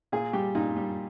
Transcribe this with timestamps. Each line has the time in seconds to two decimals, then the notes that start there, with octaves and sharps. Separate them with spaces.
0.12 A#2 G#4
0.33 G3 G4
0.55 A#2 D#4
0.77 G3